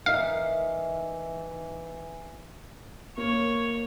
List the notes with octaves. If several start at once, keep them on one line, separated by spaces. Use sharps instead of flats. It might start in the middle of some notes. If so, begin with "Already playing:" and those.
E3 D#4 A#4 E5 F5
A#3 C#5